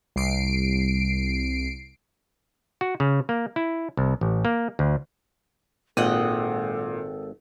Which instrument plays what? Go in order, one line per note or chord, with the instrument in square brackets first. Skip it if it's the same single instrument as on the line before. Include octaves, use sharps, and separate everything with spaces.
[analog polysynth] C2 C7 D7
[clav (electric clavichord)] F#4
C#3
A#3
E4
C2
A1
A#3
D2
[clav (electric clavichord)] G#1 [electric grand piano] A#2 [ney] A4 [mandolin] D#5 F#5 G5